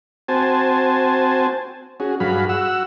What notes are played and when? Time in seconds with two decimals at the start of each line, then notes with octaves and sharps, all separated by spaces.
0.28 C4 F#4 C5 G#5 A5
2.00 C#4 F#4 G#4
2.20 G2 F#3 F#4 G#4 F5 B5
2.49 F#4 F#5 E6